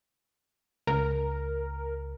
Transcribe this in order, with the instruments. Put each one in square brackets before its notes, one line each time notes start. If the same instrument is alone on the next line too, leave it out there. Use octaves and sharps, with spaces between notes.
[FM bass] C#2 [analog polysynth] A#4